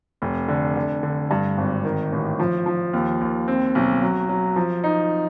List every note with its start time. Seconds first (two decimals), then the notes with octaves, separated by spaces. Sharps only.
0.22 F1
0.48 D3
0.77 D3
1.03 D3
1.31 G2
1.58 G#1
1.85 D#3
2.12 A1
2.39 F3
2.66 F3
2.93 D#2
3.21 D#2
3.48 C4
3.75 B1
4.02 F#3
4.29 F#3
4.56 F3
4.84 D#4